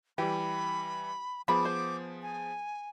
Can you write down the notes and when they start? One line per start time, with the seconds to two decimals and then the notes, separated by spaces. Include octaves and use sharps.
0.18 E3 G3 G4 B5
1.48 F3 B3 G#4 B5 D6
1.65 C5
2.22 G#5